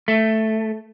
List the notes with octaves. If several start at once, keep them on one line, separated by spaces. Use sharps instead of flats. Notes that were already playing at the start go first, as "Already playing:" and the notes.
A3